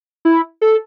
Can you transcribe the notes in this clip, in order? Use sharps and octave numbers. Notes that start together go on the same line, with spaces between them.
E4
A4